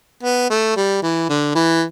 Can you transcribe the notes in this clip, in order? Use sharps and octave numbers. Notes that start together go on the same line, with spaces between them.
B3
A3
G3
E3
D3
E3